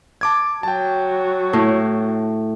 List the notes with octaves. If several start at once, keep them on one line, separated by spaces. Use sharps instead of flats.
A5 D6 G#6
F#3 G5 A5
A2